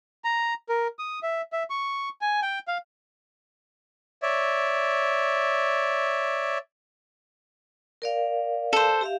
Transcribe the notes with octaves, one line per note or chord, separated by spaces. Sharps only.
A#5
A#4
D#6
E5
E5
C#6
G#5
G5
F5
C#5 D5 E5
A#4 D5 F5
A4 C5
G4 E5 F5